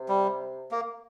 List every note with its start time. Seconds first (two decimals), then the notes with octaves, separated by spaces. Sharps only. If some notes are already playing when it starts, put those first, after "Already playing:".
Already playing: C3
0.09 G3
0.71 A#3